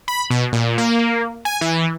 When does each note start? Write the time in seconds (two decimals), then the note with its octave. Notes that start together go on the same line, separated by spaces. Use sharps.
0.08 B5
0.30 B2
0.53 A#2
0.78 A#3
1.45 G#5
1.61 E3